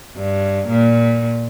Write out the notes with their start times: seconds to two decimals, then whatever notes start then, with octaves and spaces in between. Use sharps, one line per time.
0.16 G2
0.68 A#2